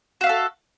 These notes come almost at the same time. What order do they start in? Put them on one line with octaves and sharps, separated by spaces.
F#4 F5 E5 A4